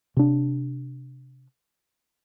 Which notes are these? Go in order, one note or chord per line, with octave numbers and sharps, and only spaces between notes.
C3 D4